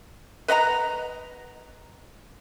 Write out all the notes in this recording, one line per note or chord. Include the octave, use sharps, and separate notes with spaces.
B4 D#5 F#5 A#5